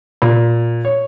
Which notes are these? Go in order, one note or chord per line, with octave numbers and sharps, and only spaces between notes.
A#2
C#5